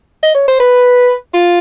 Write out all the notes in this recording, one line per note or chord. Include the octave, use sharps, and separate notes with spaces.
D#5
C#5
C5
B4
F4